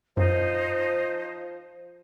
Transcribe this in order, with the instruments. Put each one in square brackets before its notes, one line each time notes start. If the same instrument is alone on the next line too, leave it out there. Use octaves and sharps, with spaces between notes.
[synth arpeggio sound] F#2 [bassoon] F3 [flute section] D#4 C5 D#5